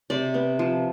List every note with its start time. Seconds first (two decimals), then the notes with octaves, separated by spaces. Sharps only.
0.10 C3 D5
0.34 B3
0.59 F3